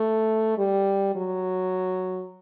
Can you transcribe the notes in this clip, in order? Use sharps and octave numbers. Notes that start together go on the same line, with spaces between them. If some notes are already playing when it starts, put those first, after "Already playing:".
Already playing: A3
G3
F#3